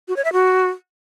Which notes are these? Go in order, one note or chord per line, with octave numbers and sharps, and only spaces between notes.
F#4
C#5
E5
F#4